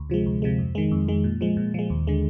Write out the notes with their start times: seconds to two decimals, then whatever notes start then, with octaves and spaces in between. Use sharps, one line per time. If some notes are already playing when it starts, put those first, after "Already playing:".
Already playing: D2
0.10 C3 F3 G#3
0.26 D2
0.42 C3 F3 G#3
0.59 F2
0.75 D#3 G#3
0.91 F2
1.08 D#3 G#3
1.24 A#2
1.41 F3 G#3
1.57 A#2
1.74 F3 G#3
1.90 D#2
2.07 D3 G#3